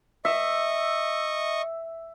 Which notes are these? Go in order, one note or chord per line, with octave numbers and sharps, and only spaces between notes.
D#5 E5 C#6